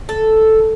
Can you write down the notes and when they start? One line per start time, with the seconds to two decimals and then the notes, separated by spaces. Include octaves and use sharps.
0.09 A4